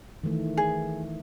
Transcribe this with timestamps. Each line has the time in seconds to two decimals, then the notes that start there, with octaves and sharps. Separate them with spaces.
0.24 D#3 E3 A3
0.57 G#4